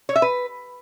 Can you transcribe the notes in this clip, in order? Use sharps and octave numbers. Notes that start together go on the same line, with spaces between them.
C#5
E5
B4